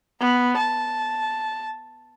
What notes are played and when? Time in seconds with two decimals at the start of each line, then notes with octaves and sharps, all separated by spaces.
0.20 B3
0.57 A5